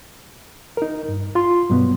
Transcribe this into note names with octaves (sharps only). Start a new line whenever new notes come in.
D#4 A#4
G2
F4 C6
G2 B2 F#3 B3